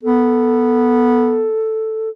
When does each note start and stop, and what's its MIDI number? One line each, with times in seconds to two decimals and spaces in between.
0.03 1.49 59
0.03 2.09 69